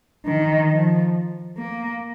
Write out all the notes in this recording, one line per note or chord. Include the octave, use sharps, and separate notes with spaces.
D#3
F3
A#3